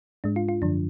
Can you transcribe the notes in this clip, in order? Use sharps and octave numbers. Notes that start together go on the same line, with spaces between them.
G#2 G#3 D4
F4
F4
F#2 D3 F3 D4